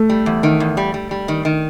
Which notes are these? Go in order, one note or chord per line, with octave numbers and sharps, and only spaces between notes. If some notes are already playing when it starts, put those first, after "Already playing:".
Already playing: A3
G3
E2
D#3
E2
G3
G3
G3
D#3
D#3